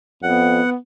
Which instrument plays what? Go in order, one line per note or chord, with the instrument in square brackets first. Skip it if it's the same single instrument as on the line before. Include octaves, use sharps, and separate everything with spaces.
[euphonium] F2 [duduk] B3 [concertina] F#5